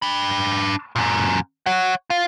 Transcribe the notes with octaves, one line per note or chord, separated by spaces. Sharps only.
D4 B5
F#2 A#2
C#5 F#5
F4